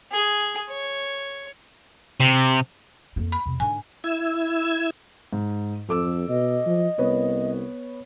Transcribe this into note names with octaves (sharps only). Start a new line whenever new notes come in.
G#4
C#5
C3
F2 A#3
B5
E2 C3
G#2 D3 G#5
E4 E6 G#6
G#2
F2 A4 D6 E6
B2 D#5
F3
C2 B3 B4 C#5